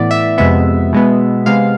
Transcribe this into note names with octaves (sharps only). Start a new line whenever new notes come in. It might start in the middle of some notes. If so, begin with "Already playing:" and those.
Already playing: A2 E3 B3 D5
E5
F2 C3 G#3 B3 E5
B2 G#3 B3
C3 G#3 B3 F5